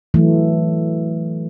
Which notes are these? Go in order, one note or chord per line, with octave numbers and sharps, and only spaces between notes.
E3 F#3 A3